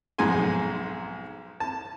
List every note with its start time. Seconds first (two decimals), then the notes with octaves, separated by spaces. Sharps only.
0.18 B1 F2 G#2 G#4 G#5 C6
1.60 A5